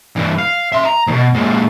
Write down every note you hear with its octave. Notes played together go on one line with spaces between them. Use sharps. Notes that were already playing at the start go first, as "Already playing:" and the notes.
G2 E3
F5
E5 C6
A#5
D#2 B2
A#2 G#3